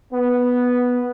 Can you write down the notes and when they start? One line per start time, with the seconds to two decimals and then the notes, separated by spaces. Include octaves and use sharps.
0.12 B3